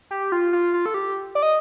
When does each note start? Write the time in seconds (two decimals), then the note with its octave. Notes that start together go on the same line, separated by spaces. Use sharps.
0.11 G4
0.32 F4
0.53 F4
0.74 F4
0.86 A4
0.94 G4
1.35 D5
1.43 D#5